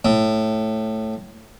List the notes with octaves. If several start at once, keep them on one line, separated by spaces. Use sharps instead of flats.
A2